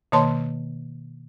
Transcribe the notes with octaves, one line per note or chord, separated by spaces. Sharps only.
B2 D#3 A#3 C#5 A5 C6